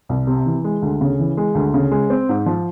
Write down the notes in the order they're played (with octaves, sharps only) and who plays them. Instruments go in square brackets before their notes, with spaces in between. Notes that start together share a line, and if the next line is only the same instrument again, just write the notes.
[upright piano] C2
C3
E3
G#3
D2
C#3
E3
G#3
D2
C#3
G#3
C4
G#2
F3